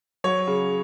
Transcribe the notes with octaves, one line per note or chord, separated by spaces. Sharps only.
F#3 C#5
C#3